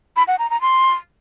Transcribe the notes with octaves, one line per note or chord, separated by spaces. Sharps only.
B5
F#5
A#5
A#5
C6